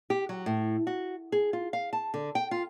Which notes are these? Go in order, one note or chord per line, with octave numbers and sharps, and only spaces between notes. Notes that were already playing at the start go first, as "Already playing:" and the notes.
G4
F#3
A2
F#4
G#4
F4
F5
A5
D3
G5
F4